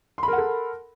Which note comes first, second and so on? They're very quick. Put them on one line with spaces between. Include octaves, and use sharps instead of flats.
C6 B5 A#4 F#5 A4